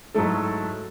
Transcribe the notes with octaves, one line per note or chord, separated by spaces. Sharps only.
G#2 F#3 A3 E4 A4